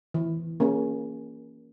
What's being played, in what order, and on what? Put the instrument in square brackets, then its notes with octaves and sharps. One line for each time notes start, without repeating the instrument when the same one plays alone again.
[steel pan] E3
A#3 C#4 G#4